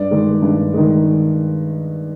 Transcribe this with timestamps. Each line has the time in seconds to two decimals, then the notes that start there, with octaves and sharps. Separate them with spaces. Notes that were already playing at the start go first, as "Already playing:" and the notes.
Already playing: G2 D5
0.11 D#3 G#3
0.42 G2
0.74 D#3 G#3